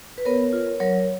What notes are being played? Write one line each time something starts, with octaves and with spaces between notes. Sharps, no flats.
B4
B3 A#4 C#5
F4
F#3 A#4 C#5